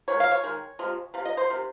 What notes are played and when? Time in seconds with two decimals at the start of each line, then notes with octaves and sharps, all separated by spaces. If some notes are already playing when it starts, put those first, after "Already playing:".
0.08 D#3 G#3 C#5
0.20 F5
0.32 C#5
0.43 D#3 G#3
0.79 C3 F3 G#3
1.14 C3 F3
1.25 D#5
1.37 C5
1.50 C3 D#3